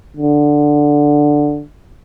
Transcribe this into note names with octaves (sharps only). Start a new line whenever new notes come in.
D3